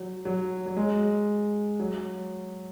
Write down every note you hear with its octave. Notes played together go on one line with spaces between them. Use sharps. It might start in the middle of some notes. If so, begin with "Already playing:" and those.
Already playing: F#3
F#3
F#3
G#3
F#3